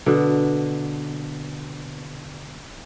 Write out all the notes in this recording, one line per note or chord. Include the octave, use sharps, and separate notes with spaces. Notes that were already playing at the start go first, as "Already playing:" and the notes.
B2 D3